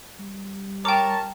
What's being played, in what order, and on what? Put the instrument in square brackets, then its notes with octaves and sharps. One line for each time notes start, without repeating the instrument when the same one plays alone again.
[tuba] G3
[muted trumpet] A#4 [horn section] C#5 A5 [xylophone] G5 D6